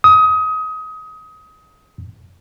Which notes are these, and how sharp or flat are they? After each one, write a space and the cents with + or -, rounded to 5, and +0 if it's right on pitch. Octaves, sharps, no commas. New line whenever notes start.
D#6 +25